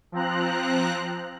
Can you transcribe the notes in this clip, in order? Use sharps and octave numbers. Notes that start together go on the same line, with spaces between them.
F3 C4 A#5 F#6